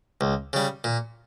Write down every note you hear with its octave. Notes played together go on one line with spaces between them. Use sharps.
C#2
C#3 G3
A#2